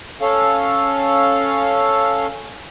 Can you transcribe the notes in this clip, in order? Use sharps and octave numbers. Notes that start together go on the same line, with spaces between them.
C#4 A4 F5